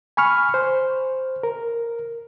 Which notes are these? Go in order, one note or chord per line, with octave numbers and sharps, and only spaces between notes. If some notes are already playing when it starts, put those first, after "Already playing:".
G#5 B5 C#6 F6
C5
A#4